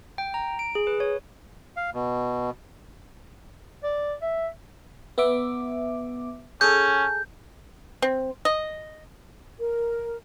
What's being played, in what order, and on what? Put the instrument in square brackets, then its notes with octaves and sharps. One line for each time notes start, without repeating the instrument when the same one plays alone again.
[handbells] G5
A#5
D7
G#4
B4
C#5
[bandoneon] F5
B2
[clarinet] D5
E5
[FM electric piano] B3 E5 D6
[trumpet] C#4 [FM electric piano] G#4 A4 [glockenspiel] G6
[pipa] C4
D#5
[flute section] A#4